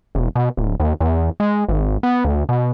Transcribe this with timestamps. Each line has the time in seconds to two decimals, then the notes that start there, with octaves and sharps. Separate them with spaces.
0.15 E1
0.35 B2
0.57 D1
0.80 D#2
1.00 E2
1.40 G#3
1.68 G#1
2.03 B3
2.25 D2
2.49 B2